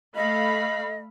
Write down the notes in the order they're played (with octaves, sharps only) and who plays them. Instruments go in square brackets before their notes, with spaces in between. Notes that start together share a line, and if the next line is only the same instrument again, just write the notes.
[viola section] A3 F5 B5 [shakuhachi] D#5